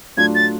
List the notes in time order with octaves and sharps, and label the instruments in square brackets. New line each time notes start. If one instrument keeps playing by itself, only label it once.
[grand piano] A2 F#3 A3 D4 F4 [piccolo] G#6
[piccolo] A6